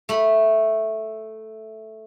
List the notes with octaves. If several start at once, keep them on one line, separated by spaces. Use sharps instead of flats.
A3 B5